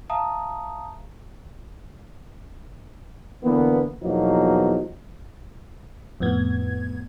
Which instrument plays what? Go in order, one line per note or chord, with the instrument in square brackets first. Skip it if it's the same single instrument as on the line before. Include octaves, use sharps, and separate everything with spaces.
[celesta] E5 F5 A5 A#5 D#6
[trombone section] D3 E3 A#3 B3
E2 B2 F3 F#3 A#3 D#4
[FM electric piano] F2 A2 B3 G#6